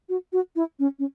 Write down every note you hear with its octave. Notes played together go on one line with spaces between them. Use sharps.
F#4
F#4
E4
C#4
C#4